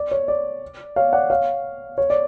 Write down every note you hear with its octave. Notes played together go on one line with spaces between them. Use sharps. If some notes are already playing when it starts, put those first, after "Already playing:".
Already playing: D5
C#5
D5
C#5 F5
D5 F#5
C#5 F5
C#5
D5